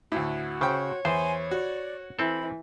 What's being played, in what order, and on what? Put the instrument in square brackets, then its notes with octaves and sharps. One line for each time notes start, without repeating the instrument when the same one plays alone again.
[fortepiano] D2 A2 [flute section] F#4
[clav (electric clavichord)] C#3 [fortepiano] C5 G5 [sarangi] C#5
[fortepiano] E2 [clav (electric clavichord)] C5 [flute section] G#5 C6
[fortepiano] F#4 [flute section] D5
[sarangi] E3 [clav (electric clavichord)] C4 A4 [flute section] E4 B5